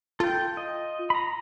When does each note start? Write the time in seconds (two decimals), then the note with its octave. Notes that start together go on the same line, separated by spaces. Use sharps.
0.20 F4 A4 G5
0.57 D#5
1.10 A#5 B5